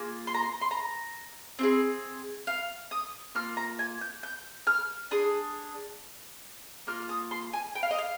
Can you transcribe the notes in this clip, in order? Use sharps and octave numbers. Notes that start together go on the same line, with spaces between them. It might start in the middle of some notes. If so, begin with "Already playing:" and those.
Already playing: A#3 F4 G#4
C6
A#5
C6
C6
A#5
C4 F4 G#4
F5
D#6
A#3 F4 F6
A#5
G#5
G6
G6
F6
D4 G#4 D#6
A#3 F4 F6
D#6
C6
G#5
G5
F5
D#5
F5